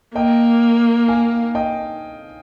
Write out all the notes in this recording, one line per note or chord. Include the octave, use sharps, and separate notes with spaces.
A#3 D#5 G5
F5 G#5
D#5 G5